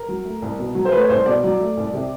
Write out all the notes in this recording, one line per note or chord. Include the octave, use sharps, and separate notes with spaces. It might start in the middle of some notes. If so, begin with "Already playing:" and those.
Already playing: A#4
F#3
A3
C2
B2
F#3
C5
A3 B4
C#5
C2 C5
B2 D5
F#3
A3
C2
C3